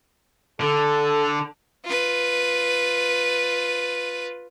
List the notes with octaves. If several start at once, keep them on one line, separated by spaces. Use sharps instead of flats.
D3 A4
F4 B4